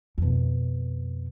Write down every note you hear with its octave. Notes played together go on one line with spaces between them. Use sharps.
F2 B2